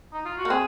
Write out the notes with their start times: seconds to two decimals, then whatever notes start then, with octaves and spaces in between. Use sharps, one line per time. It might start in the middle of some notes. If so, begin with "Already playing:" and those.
0.12 D#4
0.25 F4
0.37 F#4
0.45 A#3
0.50 C4 G#4